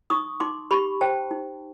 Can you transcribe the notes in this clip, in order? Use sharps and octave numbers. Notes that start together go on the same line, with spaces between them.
D#4 C#6 D#6
D#4 C6 D6
G4 B5 C#6
C5 G5 A5
D#4